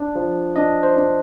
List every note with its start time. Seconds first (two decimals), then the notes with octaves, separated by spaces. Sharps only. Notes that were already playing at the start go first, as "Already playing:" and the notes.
Already playing: D4 D5
0.15 F3
0.56 D4 D#5
0.83 C5
0.97 D4